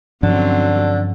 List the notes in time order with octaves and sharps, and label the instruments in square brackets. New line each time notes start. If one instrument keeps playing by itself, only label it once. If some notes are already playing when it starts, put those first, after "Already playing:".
[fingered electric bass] G2 F3 C#4 [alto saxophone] D3 [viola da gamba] F#3 C4